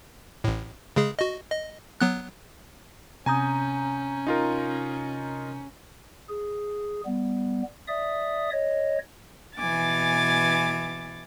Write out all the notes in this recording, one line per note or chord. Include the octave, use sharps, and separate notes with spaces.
A1 A2
C#3 G#3 G#4
F#4 D#5
D#5
F#3 B3 F#6
C3 C#4 G#5 A#5 D#6 G6
D#4 F4 A#4
G#4
G3 B3
D5 E5 D#6
C#5 D#5
B2 E3 G#5 D6 A6